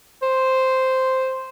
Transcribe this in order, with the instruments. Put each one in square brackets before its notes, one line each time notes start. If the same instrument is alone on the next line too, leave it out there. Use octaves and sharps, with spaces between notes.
[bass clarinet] C5